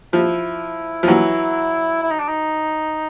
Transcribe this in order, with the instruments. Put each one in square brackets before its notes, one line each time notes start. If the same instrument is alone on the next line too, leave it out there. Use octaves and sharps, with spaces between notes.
[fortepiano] F3 [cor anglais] E4
[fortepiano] F3
E3 F#3
[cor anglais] E4
D#4
D4
D#4